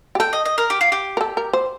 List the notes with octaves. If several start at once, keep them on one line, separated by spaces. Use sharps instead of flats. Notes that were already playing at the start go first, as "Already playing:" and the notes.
G4
A4 G5
D#5
D#5
A#4
G4
F4
G4
A#4
A4
A#4
C5